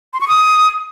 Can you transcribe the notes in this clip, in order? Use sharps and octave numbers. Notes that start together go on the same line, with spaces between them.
C6
C#6
D#6